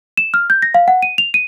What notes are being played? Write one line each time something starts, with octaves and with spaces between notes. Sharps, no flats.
E7
F6
G6
A#6
F5
F#5
D#7
F7
D#7